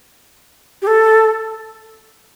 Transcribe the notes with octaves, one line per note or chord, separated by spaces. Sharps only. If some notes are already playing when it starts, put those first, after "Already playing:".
G4
A4